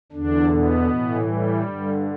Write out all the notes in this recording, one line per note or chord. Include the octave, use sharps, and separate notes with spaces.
E2 D3 D4
B2 B3
A2 E3
G3
G2 D3